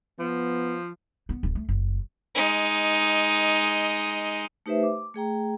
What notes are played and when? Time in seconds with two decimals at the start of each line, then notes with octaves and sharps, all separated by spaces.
0.19 F3 B3
1.29 B3
1.43 D1
1.55 A3
1.69 F#1
2.35 G#3 D#4
4.66 A3 D#4 G4 B4 C5 E5
4.83 D6
5.14 A3 G#4 G5 A#5